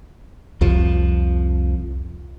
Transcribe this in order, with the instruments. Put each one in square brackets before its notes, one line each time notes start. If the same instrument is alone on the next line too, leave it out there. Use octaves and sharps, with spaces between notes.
[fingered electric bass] C2 F2 F3